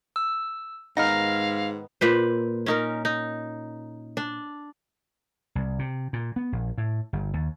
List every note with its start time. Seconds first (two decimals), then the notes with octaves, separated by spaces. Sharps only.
0.16 E6
0.97 G#2 D#3 B3 D#4 F5 F6 A#6
2.01 A#2 B4 C5
2.66 C#4 D#4 A#4
3.05 D#4
4.17 D4
5.55 C2
5.79 C3
6.13 A#2
6.36 B3
6.52 A#1
6.78 A2
7.13 G1
7.33 D#2